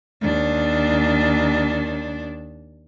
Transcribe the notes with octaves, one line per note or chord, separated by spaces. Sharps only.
D#2 D4